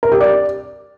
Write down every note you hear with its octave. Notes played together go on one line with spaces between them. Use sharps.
A#4
G4
D5